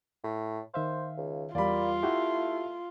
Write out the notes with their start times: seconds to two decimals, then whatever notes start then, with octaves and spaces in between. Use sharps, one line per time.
0.24 A2
0.74 D#3 C5 E5 F5
1.17 C#2
1.55 E2 G3 A#3 F4 D5 B5
2.03 A3 E4 F#4 G4